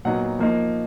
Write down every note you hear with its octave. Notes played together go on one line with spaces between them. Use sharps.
A#2 F#3 B3 D#4 F#5
F3 A#3 D#4